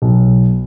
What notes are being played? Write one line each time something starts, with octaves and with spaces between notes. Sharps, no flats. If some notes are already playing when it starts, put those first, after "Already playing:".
B1